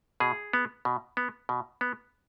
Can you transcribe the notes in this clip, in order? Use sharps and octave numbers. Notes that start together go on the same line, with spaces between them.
B2 G#4
B3
B2
B3
B2
B3